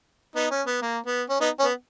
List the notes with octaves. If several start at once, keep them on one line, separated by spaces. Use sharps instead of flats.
B3 D#4
C#4
B3
A#3
B3
C#4
B3 D#4
C#4
B3